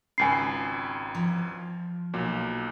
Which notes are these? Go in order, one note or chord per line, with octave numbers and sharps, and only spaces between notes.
G#1 C#2 G#5 B5 C7
F3
B1 A#2 F#3